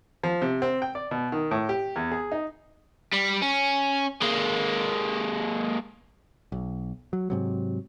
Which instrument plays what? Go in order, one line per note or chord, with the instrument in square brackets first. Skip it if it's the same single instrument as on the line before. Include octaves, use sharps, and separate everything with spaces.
[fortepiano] F3
C3
C4
G5
D5
B2
D#3
A2
G4
E2
G#4
D#4
[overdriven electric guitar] G3
C#4
G#3 A#3
[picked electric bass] B1
F#3
G#2 C3 F#3